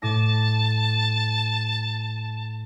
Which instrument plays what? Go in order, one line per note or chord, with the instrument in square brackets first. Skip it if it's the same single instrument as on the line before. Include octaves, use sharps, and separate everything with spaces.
[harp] A2 D6 A#6 [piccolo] A5